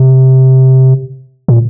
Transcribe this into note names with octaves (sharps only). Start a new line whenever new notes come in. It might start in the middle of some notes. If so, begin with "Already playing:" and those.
Already playing: C3
A#2